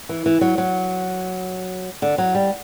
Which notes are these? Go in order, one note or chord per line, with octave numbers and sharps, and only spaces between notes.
E3
E3
F#3
F#3
D3
F#3
G3